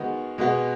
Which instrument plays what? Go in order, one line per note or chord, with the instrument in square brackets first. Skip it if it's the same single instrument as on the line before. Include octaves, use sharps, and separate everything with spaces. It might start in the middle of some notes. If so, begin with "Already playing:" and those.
Already playing: [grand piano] D#3 G#3 B3 F#4
B2 G#3 B3